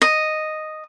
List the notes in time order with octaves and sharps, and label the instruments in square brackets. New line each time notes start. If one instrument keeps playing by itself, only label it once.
[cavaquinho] D#5